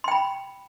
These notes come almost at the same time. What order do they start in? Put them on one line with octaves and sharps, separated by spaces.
C6 G5 B5